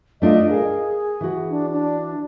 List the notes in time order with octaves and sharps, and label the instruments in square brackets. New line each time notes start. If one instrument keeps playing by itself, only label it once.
[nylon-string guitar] A3 D4 F4 [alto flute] D#5
[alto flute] G#4 [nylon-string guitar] A#4 F5
[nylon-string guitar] E3 F#4
[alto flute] D4
D4